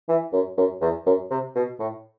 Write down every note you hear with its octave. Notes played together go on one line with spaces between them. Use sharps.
E3
F#2
F#2
E2
F#2
C3
B2
A2